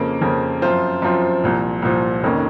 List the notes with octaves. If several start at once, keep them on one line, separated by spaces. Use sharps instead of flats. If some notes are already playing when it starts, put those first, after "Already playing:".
Already playing: F2 C#3 F3 A#3
F2 C#3 F3 A#3
F#2 F3 C4 F4 C5
F#2 F3 C4 F4 C5
C2 A#2 F3
C2 A#2 F3
F1 F2 D#3 A#3 C#4